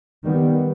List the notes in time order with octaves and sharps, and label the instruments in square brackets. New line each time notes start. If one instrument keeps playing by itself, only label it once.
[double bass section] D#3 G3 B3